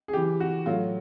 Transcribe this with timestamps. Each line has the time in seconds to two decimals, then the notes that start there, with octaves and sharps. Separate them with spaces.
0.08 G#4
0.13 C#3 E3 G4
0.40 F#4
0.66 A2 F#3 F4